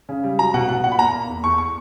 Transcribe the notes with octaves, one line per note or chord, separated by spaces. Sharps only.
C#3
G3
F#3 A#5
B2 F#5
B2 F#5
A#2 F#5
B5
A#3 A#5
A#3
E2
E2 C#6
C#6